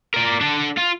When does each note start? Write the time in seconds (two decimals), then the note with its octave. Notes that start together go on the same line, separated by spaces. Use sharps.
0.14 A#4 D5
0.41 D4 A4
0.77 F4